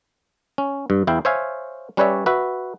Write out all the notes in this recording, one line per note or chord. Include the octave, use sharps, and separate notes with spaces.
C#4
G2
E2 E4 F5 G5
C5 C#5 E5 F5 G#5
G3 C#4 B4 C#5 D5 E5
F#4 B4 E5